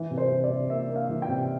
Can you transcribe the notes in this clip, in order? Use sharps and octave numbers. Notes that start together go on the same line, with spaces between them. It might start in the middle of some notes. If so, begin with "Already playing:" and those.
Already playing: E3
C3
C5
C3
D5
C3
A#3 E5
A#3
F5
E3
G5
C3